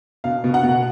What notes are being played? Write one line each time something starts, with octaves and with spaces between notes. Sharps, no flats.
B2 F5
B2
F#5
B2